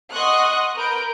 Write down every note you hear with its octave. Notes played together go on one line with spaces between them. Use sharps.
D#5 F#5 C6 C#6 D#6 F#6
A#4 B4 G6 D7